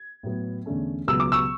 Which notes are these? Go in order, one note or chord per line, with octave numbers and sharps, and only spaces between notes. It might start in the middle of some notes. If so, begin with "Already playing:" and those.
Already playing: G#6
A2 F#3 B3
E2 D3 A3 C#4
C#2 B2 F#3 B3 E6
D6
C#6 E6